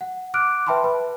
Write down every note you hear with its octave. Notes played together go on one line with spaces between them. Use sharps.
F#5
D6 F6 F#6 D7
B4 E5 G5 A5 B5 C6
B4